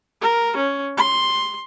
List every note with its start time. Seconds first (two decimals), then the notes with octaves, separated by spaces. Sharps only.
0.21 A#4
0.56 C#4
0.97 C6